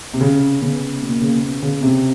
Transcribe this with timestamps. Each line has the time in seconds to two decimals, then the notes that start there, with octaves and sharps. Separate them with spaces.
0.14 C3
0.21 C#3 C#4
0.62 C#3 B3
1.02 B2 A#3
1.22 C#3
1.42 B3
1.62 C#3
1.83 C3 C4